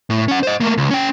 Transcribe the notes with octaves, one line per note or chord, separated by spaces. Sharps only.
A2
C#4 F#5
C5 D#5
A3 A#3
C#2
C#4 G5